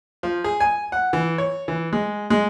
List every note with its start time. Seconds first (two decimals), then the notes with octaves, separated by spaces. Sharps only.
0.23 F3
0.44 G#4
0.60 G#5
0.92 F#5
1.13 E3
1.38 C#5
1.68 E3
1.93 G#3
2.30 G#3